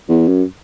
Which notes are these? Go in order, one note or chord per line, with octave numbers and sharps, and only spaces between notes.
E2
F#2